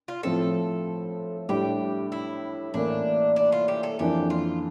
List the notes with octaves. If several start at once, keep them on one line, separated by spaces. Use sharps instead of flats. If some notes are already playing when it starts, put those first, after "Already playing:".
F4
A2 F3 A3 C4 A4
A2 G3 D4 G4
E4
A2 E3 A#3 D4
D4
F4
G4
A4
F2 E3 A#3 D4 G4
F4